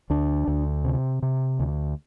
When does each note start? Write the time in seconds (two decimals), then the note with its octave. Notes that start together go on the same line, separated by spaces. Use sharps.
0.10 D2 D4
0.48 D2
0.84 C3
1.22 C3
1.59 D2